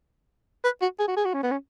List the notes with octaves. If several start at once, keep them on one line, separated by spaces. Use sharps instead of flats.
B4
F#4
G#4
F#4
G#4
F#4
C#4
B3
C#4